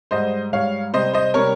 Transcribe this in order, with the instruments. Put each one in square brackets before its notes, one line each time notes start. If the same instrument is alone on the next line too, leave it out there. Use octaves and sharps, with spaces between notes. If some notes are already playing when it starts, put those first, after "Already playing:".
[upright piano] G#2 G3 C5 D#5
G#2 G3 C#5 F5
C3 G3 C5 D#5
C5 D#5
C3 G3 A#4 C#5